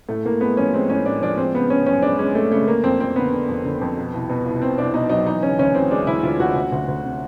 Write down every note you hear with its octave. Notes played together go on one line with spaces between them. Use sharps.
A2 A3
A2 A#3
G#3 B3
F3 C#4
G#3 C4
A2 C#4
A2 D4
F3 D4
G#3 C4
C#3 B3
C#3 C#4
F#2 C#4
G#3 D4
G#3 C#4
G#3 A3
C#3 A3
D3 A#3
F2 C4
F2 C4
D3 B3
D3
F2
D3
F2
B2
C2
B2
C2
B2 C4
C2 D4
B2 D#4
F#3 D#4
E3 D#4
C#3 C#4
D2 C#4
E3 C4
G#3 D4
D2 E4
D2 F4
D2 F#4
D2
D2
D2
C3